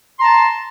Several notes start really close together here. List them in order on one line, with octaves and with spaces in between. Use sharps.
C6 A#5 A5